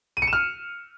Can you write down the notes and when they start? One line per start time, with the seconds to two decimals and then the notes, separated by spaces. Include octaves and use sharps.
0.17 D#7
0.22 C#7
0.27 E7
0.33 F6